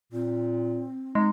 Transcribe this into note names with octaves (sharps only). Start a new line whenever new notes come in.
A#2 C4
G#3 D#4